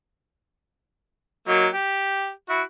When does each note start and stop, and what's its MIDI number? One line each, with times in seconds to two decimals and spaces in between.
1.48 1.67 54
1.48 1.67 58
1.48 1.67 63
1.73 2.30 67
2.50 2.62 64
2.50 2.62 66